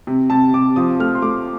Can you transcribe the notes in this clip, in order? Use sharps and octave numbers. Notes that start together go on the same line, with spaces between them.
C3
C3 A5
C3 D6
F3 D#6
A3 F6
C6
A3 D6